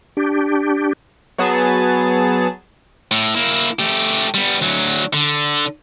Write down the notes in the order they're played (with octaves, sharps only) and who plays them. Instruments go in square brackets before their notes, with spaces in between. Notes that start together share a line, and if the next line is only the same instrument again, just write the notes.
[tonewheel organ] D4 G4
[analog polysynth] F#3 B3 G#4 A5
[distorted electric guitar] A2
A#3 E4
A3 G4
G3 B3
D2 F#3
D3